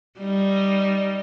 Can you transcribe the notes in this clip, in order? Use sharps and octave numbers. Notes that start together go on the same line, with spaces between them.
G3 D#4